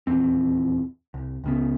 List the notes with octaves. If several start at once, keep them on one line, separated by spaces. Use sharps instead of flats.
D#1 E2 C4
C2
C#2 C#3 B3